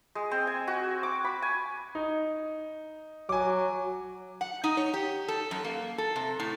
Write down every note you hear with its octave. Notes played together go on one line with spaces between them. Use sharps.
G#3
C4
G#5
F#4
D6
B5
G#5
D#4
F#3 G#5 D6
F#5
D#4
C#5
G4
A4
F#2
A#3
A4
C3
A2